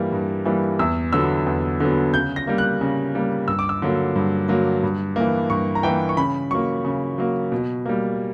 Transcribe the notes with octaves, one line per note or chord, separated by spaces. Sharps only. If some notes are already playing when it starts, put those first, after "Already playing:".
Already playing: G2 E3 G3 A#3
G2
E3 G3 A#3
E2 E6
D3 F#3 B3 E6
E2
D3 F#3 B3
C#3 G6
A#6
G3 A#3
F#6
C#3
G3 A#3
G2 E6
D6
E6
D3 F#3 A#3
G2
D3 F#3 A#3
G2
E3 A#3
G2 C#6
A#5
E3 A#3 G5
C#6
C#3 B5
F#3 A#3 C#6
C#3
F#3 A#3
B2
G3 A#3